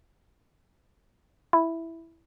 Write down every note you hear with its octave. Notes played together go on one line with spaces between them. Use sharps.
E4